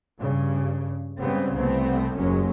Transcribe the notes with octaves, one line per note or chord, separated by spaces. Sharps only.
G2 C#3
G#2 C#3 G3 B3 C4
C2 A3 B3 C4
F#1 D#2 F#3 G#3 C#4